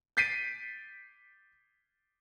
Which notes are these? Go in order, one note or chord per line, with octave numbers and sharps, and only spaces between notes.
G6 A6 B6 C7 D7 D#7